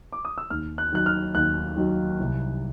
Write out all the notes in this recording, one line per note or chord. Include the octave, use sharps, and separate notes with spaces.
D6
D#6
E6
D#2 F6
F#6
D#3 F#3 F#6
F6
D#2 F#6
D#3 F#3
C2